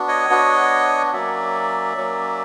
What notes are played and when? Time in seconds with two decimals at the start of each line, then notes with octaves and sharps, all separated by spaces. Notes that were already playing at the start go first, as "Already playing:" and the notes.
Already playing: B3 D4 F#4
0.08 C#5 D#5
0.30 B3 D4 F#4
1.13 F#3 A#3 C#4 D5 E5
1.97 F#3 A#3 C#4